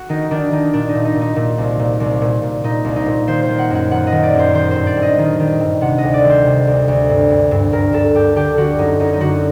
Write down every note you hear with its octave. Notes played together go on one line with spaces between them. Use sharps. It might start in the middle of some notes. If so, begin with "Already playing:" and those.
Already playing: F#4
D#3 D#4
D#3 D4
D#3 D#4
A#2 D4
D#4
A#2
D#4
A#2
D#4
A#2
C2
A#2
C2
A#2
A#2
A#2 D#4
C2
D#4
A#2
D#3 C5
C5
D#3
F#5
F#2 F#5
D#3 F#5
D#5
D#3
D5
F#2
C5
D#3 C5
G2 C5
D5
G2
D#5
D#3
D#3
G2
C3 F#5
D2 D#5
D5
D#3
C5
C3
D2
D2
G2
G2
G2
G2 A#4
G2 A4
G2 G4
D3 G4
D3 F#4
F#2 D#4
F#2 D#4
D#4
D3 F#4